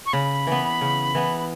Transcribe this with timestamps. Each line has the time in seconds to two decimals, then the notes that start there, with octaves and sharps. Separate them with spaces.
0.06 C#6
0.13 C#3 B5
0.47 E3 B3
0.81 C#3
1.15 E3 B3